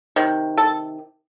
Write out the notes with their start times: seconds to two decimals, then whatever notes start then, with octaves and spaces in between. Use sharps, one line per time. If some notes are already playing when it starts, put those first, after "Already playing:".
0.16 C3 D#3
0.58 A4